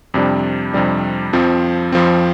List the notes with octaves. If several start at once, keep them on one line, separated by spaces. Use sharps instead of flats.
F2 C3 G3 D4
F2 C3 G3 D4
F2 F3 C4
F2 F3 C4